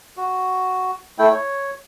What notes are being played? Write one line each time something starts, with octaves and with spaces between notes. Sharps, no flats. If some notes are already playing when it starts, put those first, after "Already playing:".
F#4
A3 E4 G5
C#5